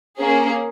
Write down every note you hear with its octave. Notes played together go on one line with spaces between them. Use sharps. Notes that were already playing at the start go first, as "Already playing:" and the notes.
A#3 C#4 G#4